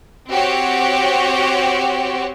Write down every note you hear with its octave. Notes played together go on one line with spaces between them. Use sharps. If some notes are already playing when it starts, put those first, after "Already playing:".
C4 F#4 G4 C#5